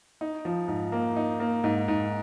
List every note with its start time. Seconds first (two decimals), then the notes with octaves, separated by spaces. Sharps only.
0.21 D#4
0.45 F3
0.68 G#2
0.92 A#3
1.16 D#4
1.40 A#3
1.64 G#2
1.88 G#2